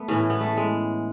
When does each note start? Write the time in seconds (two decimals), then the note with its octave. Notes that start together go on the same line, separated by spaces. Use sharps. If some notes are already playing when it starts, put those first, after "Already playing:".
Already playing: A3 B3
0.08 A2 E3 C#4
0.30 B3
0.41 A3
0.57 G#3